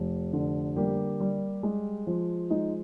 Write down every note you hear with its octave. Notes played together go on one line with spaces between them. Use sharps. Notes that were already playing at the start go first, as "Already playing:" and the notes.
Already playing: F1
D3
G3 A#3 G4
G3
G#3
F3
G#3 D#4